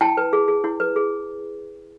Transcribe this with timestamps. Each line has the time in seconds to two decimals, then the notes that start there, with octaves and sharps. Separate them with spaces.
0.01 E4 G5 A5
0.17 B4
0.33 G#4
0.48 G#4
0.64 E4
0.80 B4
0.96 G#4